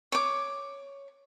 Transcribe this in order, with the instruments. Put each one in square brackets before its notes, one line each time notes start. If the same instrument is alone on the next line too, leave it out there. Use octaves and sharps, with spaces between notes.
[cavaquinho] C#5 D6